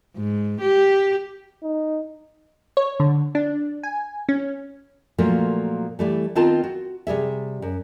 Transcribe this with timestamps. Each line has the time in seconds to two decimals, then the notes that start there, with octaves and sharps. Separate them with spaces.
0.16 G#2
0.61 G4
1.63 D#4
2.77 C#5
3.00 D3
3.35 D4
3.83 G#5
4.29 C#4
5.18 A#2 F3 F#3 A3 A#3
5.99 E3 G3 A3
6.35 D#3 B3 C4 F4 A#4 A5
6.64 F#4
7.07 C3 G3 G#4 E5
7.62 F#2